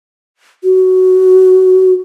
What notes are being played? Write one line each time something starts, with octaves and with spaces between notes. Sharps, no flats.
F#4